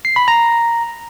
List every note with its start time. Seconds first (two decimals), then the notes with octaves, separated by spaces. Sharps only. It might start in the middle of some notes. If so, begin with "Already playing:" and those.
0.05 C7
0.16 B5
0.28 A#5